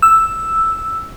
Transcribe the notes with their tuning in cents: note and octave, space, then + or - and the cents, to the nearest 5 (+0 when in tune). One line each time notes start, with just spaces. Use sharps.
E6 +0